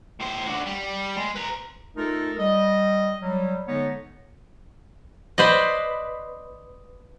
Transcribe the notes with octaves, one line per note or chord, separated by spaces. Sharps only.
A2 C5
D4 F#4
G3
G#3
B4 A#5
A3 D#4 F4 A4 A#4
G3 D#5
F#3 G3
D3 G#3 B3 D#4 A4 C#5
B4 C5 D5 D#5